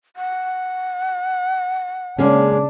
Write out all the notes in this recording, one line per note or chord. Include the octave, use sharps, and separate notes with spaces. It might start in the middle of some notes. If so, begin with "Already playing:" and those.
F#5
C#3 G#3 A#3 C#4 D4